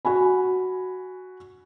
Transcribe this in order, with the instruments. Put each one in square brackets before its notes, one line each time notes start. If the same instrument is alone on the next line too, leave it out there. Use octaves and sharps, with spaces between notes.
[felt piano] F#4 G#5 B5